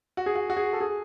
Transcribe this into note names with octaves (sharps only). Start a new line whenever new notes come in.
F#4
G#4
F#4
F#4
G#4
A4
G#4